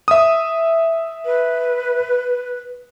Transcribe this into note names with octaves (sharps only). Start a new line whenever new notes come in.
E5 D#6
B4